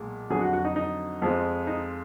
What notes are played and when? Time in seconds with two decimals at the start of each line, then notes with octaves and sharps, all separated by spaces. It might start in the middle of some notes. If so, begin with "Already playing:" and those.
Already playing: B1 A#2 G#3
0.30 F2 D3 F#3 G#4
0.41 F#4
0.53 F#4
0.65 D#4
0.76 D#4
1.22 F2 F3 G#3
1.67 D#4